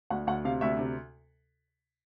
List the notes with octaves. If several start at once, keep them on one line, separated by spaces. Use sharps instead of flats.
D2 F#5
D2 F#5
C3 F5
D2 E5
C3